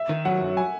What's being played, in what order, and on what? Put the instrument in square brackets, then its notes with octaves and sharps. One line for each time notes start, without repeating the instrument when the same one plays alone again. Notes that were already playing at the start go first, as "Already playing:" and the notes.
Already playing: [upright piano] E5
[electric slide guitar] D#3
[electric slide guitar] F#3 [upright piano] F#5
[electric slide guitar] F#2
[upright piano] G#5